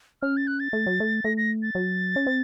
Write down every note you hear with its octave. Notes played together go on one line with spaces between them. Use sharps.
C#4 F6
A6
F#6
A6
A3
F#3
A3
A3 A#6
A#6
A6
F#3
C#4
C4